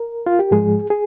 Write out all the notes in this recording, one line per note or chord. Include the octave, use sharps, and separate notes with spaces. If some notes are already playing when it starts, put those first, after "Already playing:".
Already playing: A#4
F4
G4
G#2 F3 G#3 G#4
G#4